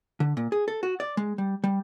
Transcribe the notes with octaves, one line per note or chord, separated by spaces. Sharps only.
D3
A#2
G#4
A4
F#4
D5
G#3
G3
G3